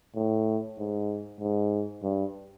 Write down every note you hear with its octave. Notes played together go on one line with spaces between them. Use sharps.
A2
G#2
G#2
G2